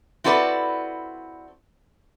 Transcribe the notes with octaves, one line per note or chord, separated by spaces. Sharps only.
C4 E4 F#4 A4 B4 D5